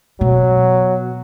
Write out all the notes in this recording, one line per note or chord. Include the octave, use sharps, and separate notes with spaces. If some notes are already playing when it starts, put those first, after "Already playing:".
B2 F#3